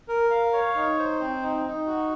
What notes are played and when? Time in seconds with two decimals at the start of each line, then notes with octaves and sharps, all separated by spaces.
0.08 A#4
0.30 F5
0.53 C#5
0.75 D#4
0.98 C5
1.20 C4
1.42 D#4
1.65 D#4
1.87 F#4